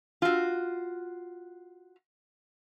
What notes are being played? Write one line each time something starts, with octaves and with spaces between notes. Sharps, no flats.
F4 F#4